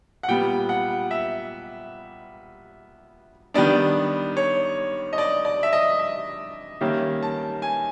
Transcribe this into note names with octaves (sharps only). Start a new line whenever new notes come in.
F#5
A#2 G3 B3 G5
F#5
E5
D#3 G3 B3 D4 D5
C#5
D#5
D5
D5
E5
D#5
E5
D#3 G3 A#3 C#4 E5
A5
G#5